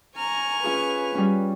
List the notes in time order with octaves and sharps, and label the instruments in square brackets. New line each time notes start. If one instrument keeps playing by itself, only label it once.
[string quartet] G#5 C#6 F6 [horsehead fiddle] A#5
[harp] C#4 F4 G#4 [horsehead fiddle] B4
[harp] G3 C#4